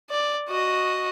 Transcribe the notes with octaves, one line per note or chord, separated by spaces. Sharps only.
D5
F#4 D#5